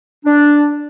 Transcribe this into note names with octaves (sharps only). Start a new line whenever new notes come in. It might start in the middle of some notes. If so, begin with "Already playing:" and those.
D4